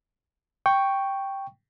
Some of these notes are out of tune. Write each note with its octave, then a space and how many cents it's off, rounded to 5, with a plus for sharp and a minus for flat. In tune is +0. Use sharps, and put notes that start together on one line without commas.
G5 +0 C#6 +0